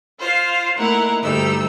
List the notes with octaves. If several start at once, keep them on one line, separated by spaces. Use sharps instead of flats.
F4 C5 F5
A3 A#3 D#4 E4 A#4 F#5
D2 G2 G3 D#4 A4 E6